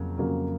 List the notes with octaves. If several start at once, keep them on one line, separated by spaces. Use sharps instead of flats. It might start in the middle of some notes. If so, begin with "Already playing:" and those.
Already playing: F2 C#3 F#3 A#3
F2 C#3 F#3 A#3